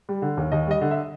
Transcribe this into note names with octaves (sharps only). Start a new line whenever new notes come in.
G3
D3
D#2
D#2 D#5
G3 D#5
D3
E5